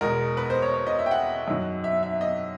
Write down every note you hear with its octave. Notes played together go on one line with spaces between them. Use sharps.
E2 B2 G#3 A#4
B4
C5
C#5
C#5
D#5
E5
G5
F#5
F#2 D#3 F#3
E5
E5
D#5